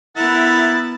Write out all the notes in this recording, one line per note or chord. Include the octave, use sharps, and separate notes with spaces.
B3 E4 A#4 E5 F#5 A6